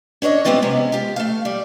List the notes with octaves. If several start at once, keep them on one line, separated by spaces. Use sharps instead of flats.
C#4 D4 C#5 D#5
G3 G#3 B3 C4 F4 G4
C3 G#3 B3 C#4
F4 G4
A3 F5
G3